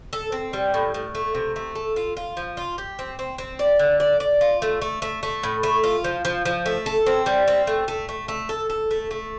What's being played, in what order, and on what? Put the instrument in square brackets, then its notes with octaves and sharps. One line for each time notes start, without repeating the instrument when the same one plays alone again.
[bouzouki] A4
C4
G3
A2
A2
A3
C3
A3
A4
F4
F4
F3
F4
G4
C4
C4
C4
D5
D3
D5
D5
F4
A3
A3
A3
A3
A2
A3
F4
F3
F3
F3
A3
A4
C4
G3
C4
A3
A3
A3
A3
A4
A4
A3
A3